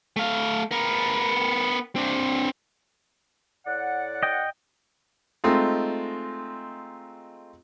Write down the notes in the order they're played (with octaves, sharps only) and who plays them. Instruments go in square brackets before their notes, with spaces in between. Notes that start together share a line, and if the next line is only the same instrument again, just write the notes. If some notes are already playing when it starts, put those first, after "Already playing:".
[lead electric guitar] A3 F5
B3 A#4
C4 D4
[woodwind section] A2 D5 F#5
[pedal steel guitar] D#5 G5
[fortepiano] G#3 A3 C4 D#4 F4